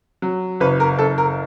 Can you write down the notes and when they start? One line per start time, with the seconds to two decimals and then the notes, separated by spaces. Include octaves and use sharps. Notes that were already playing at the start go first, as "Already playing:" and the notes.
0.22 F#3
0.60 F#1 B4
0.80 A#4
0.99 F#1 A4
1.18 A#4